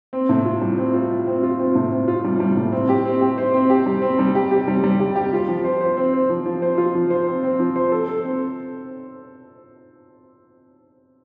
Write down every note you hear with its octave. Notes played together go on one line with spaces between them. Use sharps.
C4
A2
F4
G3
C4
F4
F4
C4
F4
C4
A2
C4
F4
G3
G3
A2
C4
G4
C4
G4
C5
C4
G4
G3
C4
G3
G4
G4
G3
G3
G4
G4
F4
F3
C5
C5
C4
C5
F3
F3
C5
F4
F3
C5
C4
C4
F3
C5
A4
A4
C4